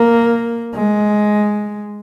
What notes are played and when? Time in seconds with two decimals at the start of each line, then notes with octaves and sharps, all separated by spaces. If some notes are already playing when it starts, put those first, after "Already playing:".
Already playing: A#3
0.74 G#3